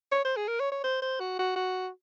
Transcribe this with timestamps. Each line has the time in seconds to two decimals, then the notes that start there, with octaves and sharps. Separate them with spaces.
0.12 C#5
0.25 C5
0.37 G#4
0.48 A#4
0.60 C#5
0.72 C#5
0.84 C5
1.02 C5
1.20 F#4
1.39 F#4
1.56 F#4